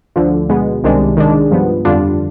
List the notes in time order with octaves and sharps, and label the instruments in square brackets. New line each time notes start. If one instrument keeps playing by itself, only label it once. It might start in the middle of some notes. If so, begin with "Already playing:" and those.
[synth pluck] D2 D3 F3
B2 G#3 B3
C2 C3 D#3 G#3 D4
D#3 G#3 D4
G2 F3 B3
F2 D3 G3 D4 F4